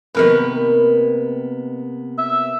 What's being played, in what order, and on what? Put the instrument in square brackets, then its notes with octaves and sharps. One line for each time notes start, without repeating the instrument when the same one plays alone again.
[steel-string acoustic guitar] C3 A#3 B3 [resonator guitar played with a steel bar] D#3 A#4 B4
[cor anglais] E5